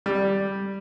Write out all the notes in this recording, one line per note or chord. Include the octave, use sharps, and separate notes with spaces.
G3